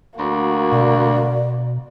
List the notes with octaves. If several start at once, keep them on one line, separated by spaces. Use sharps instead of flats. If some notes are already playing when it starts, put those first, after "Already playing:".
D2 A#3 F#4
B2 D5